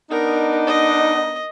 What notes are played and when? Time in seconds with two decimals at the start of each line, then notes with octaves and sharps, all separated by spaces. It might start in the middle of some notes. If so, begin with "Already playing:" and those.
0.10 B3 D4 D#4 A#4
0.67 D#5